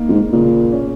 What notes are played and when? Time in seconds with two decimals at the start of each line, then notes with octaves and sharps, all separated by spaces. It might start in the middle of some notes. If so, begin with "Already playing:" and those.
Already playing: A#3 D#4
0.09 F2
0.13 G#2
0.33 A#2 C#3
0.72 C#4